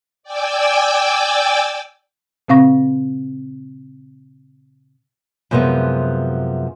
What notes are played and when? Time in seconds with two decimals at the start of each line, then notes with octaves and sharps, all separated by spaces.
0.23 D5 G5 G#5 D6 E6
2.48 A#2 C#3 C4 F5 C#6 A#6
5.51 F#2 C3 F3 G#3 B3